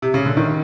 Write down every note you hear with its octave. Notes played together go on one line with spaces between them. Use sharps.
C3
C#3
D3
D#3